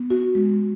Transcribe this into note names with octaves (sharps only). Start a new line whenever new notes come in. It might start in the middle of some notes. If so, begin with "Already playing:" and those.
Already playing: B3
F#4
G#3